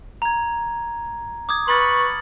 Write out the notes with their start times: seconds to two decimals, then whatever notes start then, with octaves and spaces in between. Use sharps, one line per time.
0.22 A#5 G#6
1.49 D6 D#6 G#6
1.68 B4 C#6 F6 A6 F#7